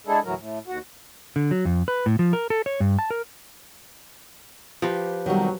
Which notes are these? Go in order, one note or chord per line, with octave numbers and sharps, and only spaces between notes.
G#3 D4 E4 G#4 A4
D2 A2 E3 F#3 A#4
A2
D#2 F#4
D3
F#3
F2
B4
A2
F3
A#4
A4
C#5
G2
A5
A#4
F3 G4 B4
F2 B2 D#3 F#3 G3